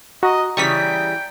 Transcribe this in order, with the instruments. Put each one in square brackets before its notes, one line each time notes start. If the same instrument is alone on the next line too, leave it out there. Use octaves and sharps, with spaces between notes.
[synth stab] F#4 [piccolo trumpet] D#5 [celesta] A#5
[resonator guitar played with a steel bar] C#3 E3 G3 [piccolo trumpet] G5 [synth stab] C#6 D#6 B6